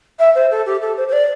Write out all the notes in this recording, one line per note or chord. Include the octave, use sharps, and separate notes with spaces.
E5
C5
A4
G4
A4
C5
C5
D5